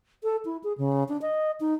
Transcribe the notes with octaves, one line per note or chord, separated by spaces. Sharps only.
A4
E4
G#4
C#3
D4
D#5
D#4